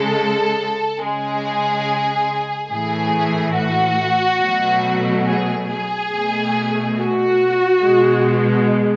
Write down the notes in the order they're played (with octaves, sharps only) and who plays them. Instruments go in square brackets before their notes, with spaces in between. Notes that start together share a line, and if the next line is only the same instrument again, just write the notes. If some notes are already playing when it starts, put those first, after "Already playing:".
Already playing: [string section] C#3 G#3 A4
C#3 G#3 G#4
A2 E3 A3 G#4
F#4
B2 F#3 A3
G#4
G#4
B2 A3
F#4
B2 G#3